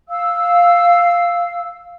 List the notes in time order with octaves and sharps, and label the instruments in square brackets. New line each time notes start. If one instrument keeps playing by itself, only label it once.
[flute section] F5 E6